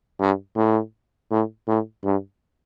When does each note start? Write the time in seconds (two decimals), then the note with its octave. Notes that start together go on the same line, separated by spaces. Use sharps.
0.20 G2
0.56 A2
1.31 A2
1.67 A2
2.04 G2